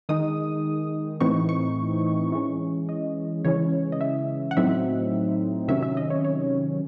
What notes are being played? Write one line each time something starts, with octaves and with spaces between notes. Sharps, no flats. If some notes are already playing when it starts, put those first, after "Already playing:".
D#3 G#3 D#4 D#6
A2 E3 C4 D#4 C#6
C#6
E3 G#3 C#4
D#5
C#3 E3 G#3 C#4 C#5
D#5
E5
F#5
A2 F#3 C4 D#4 E5
C3 D#3 F#3 C#4 E5
E5
D#5
C#5
C#5